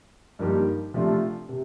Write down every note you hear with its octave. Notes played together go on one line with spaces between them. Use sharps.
G2 F3 A#3 D#4 G4
C3 F3 A3 D4 F4
C3